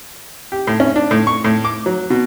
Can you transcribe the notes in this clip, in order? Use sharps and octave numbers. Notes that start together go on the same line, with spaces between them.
G4
A2
C#4
D4
A2
C#6
A2
D6
F#3
B2